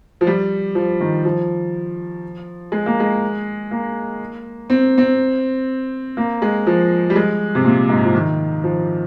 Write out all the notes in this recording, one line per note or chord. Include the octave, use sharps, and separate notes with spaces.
F3
G3
F3
D#3
F3
G#3
A#3
G#3
A#3
C4
C4
A#3
G#3
F3
G3
G#3
C3
A#2
G#2
F3
D#3
F3